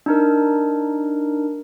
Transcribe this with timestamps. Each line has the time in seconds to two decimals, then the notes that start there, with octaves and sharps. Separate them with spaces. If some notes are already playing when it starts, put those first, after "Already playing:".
0.06 D4 D#4 A#4